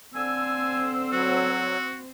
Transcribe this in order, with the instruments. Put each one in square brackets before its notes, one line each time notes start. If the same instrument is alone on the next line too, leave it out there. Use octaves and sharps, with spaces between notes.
[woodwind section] D3 E6 [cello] C4 C5 [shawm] G#5
[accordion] F#3 [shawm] F#4